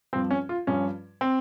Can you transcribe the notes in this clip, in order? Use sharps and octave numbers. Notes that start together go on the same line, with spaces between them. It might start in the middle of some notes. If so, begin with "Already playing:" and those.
G2 F3 C4
C#4
F4
G2 F3 C#4
C4